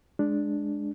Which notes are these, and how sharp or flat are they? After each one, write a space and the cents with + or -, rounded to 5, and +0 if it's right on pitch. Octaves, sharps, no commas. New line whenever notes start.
G#3 +5 D4 +0